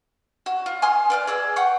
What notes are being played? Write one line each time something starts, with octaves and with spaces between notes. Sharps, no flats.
F#4
F4
G#5 C6 D#6 F6
B4 D5 F6
G#4 D5 E6
F#5 G5 C#6